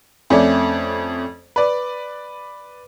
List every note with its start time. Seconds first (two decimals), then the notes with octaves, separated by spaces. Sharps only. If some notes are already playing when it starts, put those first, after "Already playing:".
0.30 F2 A3 C#4 C#5 D5
1.56 B4 D5